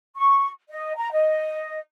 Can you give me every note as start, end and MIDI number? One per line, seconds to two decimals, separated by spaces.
0.15 0.49 85
0.69 0.95 75
0.96 1.11 82
1.12 1.79 75